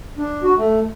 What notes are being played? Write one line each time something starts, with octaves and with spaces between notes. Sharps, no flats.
D4
F#4
A3